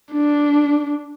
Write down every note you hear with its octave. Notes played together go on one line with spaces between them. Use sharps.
D4